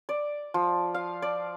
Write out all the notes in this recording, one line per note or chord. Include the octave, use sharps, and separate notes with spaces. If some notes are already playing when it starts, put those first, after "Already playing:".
D5
F3
F5
D5